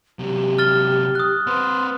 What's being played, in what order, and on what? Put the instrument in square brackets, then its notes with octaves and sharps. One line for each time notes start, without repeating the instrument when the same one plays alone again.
[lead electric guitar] C3 F#3 [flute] G4
[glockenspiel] F6 A6 G7
D#6 F#6
[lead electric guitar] C4 B4 [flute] C6